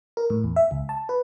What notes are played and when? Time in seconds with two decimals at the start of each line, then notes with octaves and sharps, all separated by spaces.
0.17 A#4
0.30 A2
0.44 E2
0.56 E5
0.71 C#2
0.89 A5
1.09 B4